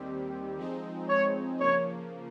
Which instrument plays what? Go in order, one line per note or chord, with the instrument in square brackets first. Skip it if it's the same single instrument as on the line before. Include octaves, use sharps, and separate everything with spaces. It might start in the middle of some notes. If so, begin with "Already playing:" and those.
Already playing: [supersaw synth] D#2 D#3 G3 C4 G4
F3 G#3 C4 D#4
[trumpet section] C#5
[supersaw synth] C#3 F3 A#3 [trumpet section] C#5